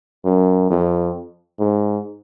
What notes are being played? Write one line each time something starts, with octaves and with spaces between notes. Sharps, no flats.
F#2
F2
G#2